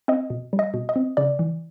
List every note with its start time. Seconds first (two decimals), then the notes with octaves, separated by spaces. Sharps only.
0.08 C4 D#5
0.30 B2
0.53 G3
0.59 D#5
0.74 B2
0.89 D#5
0.96 C4
1.17 C#3 D5
1.39 E3